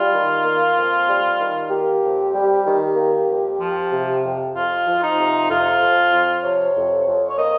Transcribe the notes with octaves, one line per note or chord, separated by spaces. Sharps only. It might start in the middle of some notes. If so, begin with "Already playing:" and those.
Already playing: G3 F4
D#3
A#3
F2
G3
D#3
A#3 G4
F2
G3
D#3
A#3
F2
F3
C3
F2
F2 F4
F3
D#4
C3
F2 F4
F2
F3
C3 C#5
F2
F2
C#5
A#3 D#5